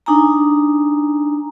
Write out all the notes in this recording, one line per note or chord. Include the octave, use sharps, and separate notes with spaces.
D4 D#4 G#5 A#5